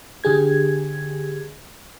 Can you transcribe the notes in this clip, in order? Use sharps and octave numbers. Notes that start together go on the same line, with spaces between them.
D3 G4 G#4 G#6